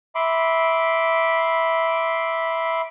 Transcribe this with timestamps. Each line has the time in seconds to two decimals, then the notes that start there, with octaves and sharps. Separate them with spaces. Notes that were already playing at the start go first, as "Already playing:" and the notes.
0.15 E5 B5 C6 D6